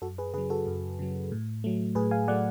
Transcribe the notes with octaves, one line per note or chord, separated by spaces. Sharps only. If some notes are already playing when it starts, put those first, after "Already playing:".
F#2 F#4 A4
G#4 B4
C#3 F#3 G#4 B4
F#4 A4
F#2
C#3 F#3
A2
F#3 A3
A2 G#4 B4
F5 G#5
F#3 A3 D5 F#5